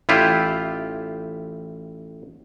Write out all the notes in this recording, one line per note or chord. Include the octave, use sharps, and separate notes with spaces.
A1 E4 F4 G4